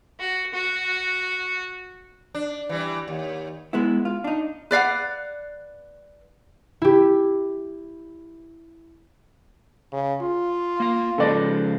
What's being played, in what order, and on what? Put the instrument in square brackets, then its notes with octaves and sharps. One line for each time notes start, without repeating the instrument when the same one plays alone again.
[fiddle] F#4
F#4
[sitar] D4
E3 G3
D#2
[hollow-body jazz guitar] G#3 B3 E4
F4
D4 D#4
[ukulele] B4 D5 F5 F#5
[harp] E4 G4
[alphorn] C#3
F4
[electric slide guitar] A#3 F5
[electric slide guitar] C#3 F3 G#3 [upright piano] A4 B4 D5